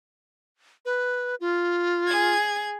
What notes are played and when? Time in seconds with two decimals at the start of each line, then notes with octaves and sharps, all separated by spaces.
0.85 B4
1.40 F4
2.07 G#4 G#6